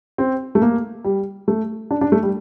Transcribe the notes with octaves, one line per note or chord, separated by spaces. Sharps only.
C4
A3
A#3
G3
A3
D4
D4
A3
G3